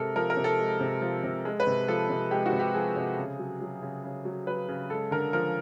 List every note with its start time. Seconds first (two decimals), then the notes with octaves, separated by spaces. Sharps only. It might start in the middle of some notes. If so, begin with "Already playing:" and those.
Already playing: C3 G#3 A4 A#4
0.16 F3 A#4
0.30 A#4
0.37 C3
0.44 A4
0.59 G#3
0.80 C3
1.02 F3
1.24 C3
1.45 G#3
1.60 B4
1.67 C3
1.88 F3 A4
2.10 C3
2.31 G#3 G4
2.46 F#4
2.52 C3
2.60 G4
2.74 F3 G#4
2.96 C3
3.18 C#3
3.39 F#3
3.61 F#3
3.82 C#3
4.04 C#3
4.25 F#3
4.47 F#3 B4
4.68 C#3
4.90 G#3 A4
5.11 D3 A#4
5.33 F3 A#4